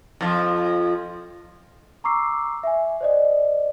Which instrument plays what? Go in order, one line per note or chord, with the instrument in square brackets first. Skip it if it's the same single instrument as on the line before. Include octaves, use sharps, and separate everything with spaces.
[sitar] F2 F3
[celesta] A#5 C#6 D6 E6 C7
E5 G#5
C5 D5 D#5